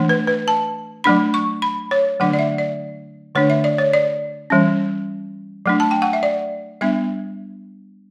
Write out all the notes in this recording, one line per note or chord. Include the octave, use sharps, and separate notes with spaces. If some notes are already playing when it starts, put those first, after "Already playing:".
Already playing: E3 A3 D4
B4
B4
A5
F#3 A3 D4 B5
C#6
B5
C#5
D3 F#3 A3 D4 F#5
D5
E5
D5
D3 A3 D4 C#5
E5
D5
C#5
D5
E3 G3 C#4
F#3 A3 D4
A5
G5
F#5
E5
D5
G3 B3 D4 E5